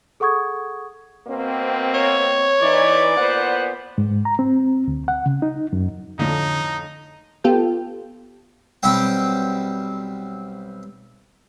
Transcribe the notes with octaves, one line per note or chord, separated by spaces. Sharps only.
G#4 A4 F#5 C#6 D#6 G#6
B2 A#3 C4
C#5
E3 D#4 D5
A#2 B3 C5 F#5
G#2
A#5
C4
D2
F#5
C#3
D#4
F#2
F2 A2 D3 D#4
B3 F4 G4 A4 G5
B1 G3 C4 G5